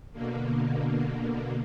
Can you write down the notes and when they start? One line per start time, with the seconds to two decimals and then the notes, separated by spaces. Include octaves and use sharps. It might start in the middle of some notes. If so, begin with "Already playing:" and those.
0.13 B2 D3 A#3